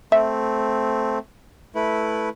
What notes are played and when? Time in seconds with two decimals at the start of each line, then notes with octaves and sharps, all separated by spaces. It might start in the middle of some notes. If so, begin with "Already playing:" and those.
0.12 A3 C4 E5
1.75 A3 E4 B4